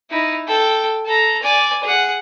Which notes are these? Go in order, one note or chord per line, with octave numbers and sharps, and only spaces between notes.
D#4 E4
A4 G5
A4 A#5
D5 G#5
G#4 F#5